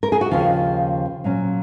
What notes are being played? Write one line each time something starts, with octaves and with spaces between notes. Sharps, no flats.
A#4
G#4
F#4
D#2 C#3 F3 F4
A#2 F#3 C#4